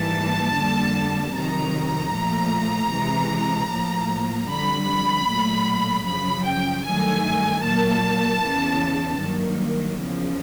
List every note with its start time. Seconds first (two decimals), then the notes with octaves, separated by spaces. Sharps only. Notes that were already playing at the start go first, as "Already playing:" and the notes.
Already playing: G#2 E3 G3 A#3 A5
0.56 F2 D3 G3 A#3
1.34 F2 C3 D#3 F#3 A#5
2.13 A#2 F3 A3
2.92 C3 E3 G#3
3.70 A2 F3 A#3
4.49 F2 D3 G3 B5
5.27 A#2 F#3 A3
6.06 F#2 C#3 F3 B5
6.45 G5
6.84 G2 D#3 F#3 A3 G#5
7.63 A#2 F#3 A#3 A5
8.42 E2 C#3 E3
9.21 G2 D#3 F#3 A#3
9.99 E2 C#3 F3